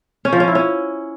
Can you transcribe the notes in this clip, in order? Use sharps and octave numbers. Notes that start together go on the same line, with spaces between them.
C#4
F3
C#4
E4
C#4